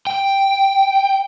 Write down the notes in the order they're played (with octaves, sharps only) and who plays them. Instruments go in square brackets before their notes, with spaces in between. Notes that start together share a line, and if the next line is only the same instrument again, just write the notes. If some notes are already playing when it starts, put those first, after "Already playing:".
[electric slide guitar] G5